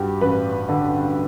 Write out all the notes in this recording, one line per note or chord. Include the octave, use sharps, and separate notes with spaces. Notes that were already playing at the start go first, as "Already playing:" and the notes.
Already playing: G2 F#4 G4
A1 B4
D3